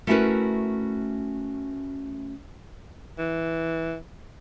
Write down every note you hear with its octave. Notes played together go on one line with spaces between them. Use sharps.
A3 C#4 E4 F#4 A#4 B4
E3